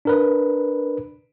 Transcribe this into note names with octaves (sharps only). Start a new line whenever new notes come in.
D4 A#4 B4